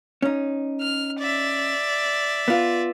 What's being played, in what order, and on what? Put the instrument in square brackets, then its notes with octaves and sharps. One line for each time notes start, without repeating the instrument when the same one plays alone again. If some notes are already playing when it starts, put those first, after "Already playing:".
[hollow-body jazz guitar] C#4 D#4
[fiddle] F6
D5 E5
[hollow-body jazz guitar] B3 F4